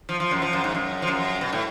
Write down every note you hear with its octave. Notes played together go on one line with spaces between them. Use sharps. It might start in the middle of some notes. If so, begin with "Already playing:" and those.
F3
F3
F#2
F3
F#2
G#2
F#2
F3
F#2
B2
A2